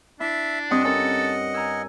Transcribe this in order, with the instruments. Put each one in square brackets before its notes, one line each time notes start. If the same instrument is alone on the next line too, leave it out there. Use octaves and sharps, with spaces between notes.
[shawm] D4 [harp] E4 [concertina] E5
[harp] G2 C4 D#6 [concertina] D#5 F#5
[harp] C#4 A#4 E6 [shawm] A4
[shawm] G#5 [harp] A#5 E6